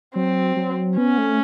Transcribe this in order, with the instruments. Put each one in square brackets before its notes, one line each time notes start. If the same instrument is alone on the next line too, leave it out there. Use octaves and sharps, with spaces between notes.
[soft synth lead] F#3 [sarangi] C4
[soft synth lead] F#3
[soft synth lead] B3 [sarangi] C#4
[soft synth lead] A3